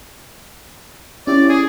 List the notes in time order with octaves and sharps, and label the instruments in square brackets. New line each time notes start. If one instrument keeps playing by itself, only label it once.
[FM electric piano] C#4 E4 G4 [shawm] D5
[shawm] G#4